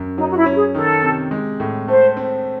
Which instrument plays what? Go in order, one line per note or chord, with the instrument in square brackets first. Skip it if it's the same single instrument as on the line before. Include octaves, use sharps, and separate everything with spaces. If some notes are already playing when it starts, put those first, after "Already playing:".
Already playing: [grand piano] F#2
[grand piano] F#3 [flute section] D#4
[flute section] F#4
E4
[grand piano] C#4
[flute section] G#4
[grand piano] D#3 [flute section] A4
[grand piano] C3
G#3
A2
[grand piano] A3 [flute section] C5
[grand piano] C4